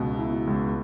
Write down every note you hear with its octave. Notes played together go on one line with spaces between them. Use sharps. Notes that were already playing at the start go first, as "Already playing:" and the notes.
Already playing: C#2 B2
E4
C#2